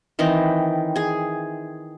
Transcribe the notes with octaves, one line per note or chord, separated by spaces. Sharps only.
D#3 E3 C4 D#4
G#4 G#5